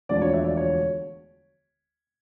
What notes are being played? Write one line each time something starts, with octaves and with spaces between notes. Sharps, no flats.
E1 D2 D3 F3 D5
C#5
E5
D5
C#5